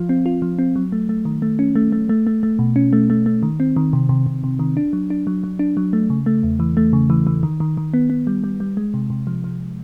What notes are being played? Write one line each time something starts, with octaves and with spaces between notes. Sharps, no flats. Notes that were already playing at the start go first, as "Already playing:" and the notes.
Already playing: F3 F4
C4
F4
F3
C4
F#3
A3
A3
D#3
A3
C#4
A3
A3
A3
A3
A3
B2
C#4
A3
A3
A3
D#3
C4
D#3
C3
C3
C3
C3
D#3
D4
F#3
D4
F#3
F#3
D4
F#3
A3
C#3
A3
E2
E3
A3
C#3
E3
E3
D#3
D#3
D#3
B3
B3
G3
G3
G3
G#3
C3
C3
F3
F3